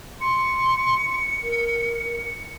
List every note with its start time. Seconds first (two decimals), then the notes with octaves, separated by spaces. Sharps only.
0.21 C6 C#7
1.43 A#4